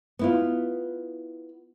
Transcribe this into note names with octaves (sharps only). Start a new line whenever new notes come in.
B3 E4 F4